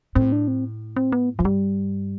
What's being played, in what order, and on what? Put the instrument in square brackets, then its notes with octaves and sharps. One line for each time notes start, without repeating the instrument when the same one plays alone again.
[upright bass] A2 [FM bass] C4
[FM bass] D4
C4
C4
B3
[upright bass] A2 [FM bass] F3
[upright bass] G2 [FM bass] G3